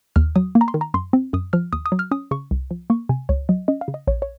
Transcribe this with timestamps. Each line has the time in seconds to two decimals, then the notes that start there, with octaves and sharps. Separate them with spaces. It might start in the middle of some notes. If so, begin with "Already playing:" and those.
0.16 D#2 F6
0.35 F#3 D#6
0.55 A#3
0.61 A#5
0.68 C6
0.74 D#3
0.81 A#5
0.94 F#2 C6
1.13 C4
1.33 F#2 D#6
1.53 F3 F6
1.73 D#2 D#6
1.86 D#6
1.92 F#3
1.99 F6
2.11 C#4 D#6
2.31 C#3 C#6
2.51 C2
2.71 F3
2.90 A#3 C#6
3.09 C3 G#5
3.29 C#2 C#5
3.49 F#3 D#5
3.68 C#4 D#5
3.81 F5
3.88 C#3
3.94 D#5
4.07 A#1 C#5
4.22 C#5